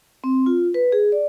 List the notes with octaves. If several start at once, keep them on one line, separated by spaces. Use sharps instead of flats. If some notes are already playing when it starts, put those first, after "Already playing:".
C4
F4
B4
G#4
D5